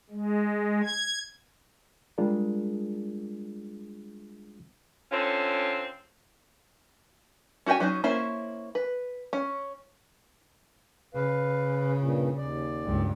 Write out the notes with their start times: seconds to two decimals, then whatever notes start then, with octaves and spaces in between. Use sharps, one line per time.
0.10 G#3
0.84 G#6
2.18 G3 G#3 D4 F4 G#4 A#4
5.11 D3 C4 C#4 F4
7.66 C#4 F#4 G4 G5 G#5
7.80 F#3 C#4 D#4
8.04 A#3 C#4 E4 C5
8.75 B4
9.33 C#4
11.14 C#3 B4 F5
11.98 G2 A#2
12.37 D#2 D5
12.84 C#2 G2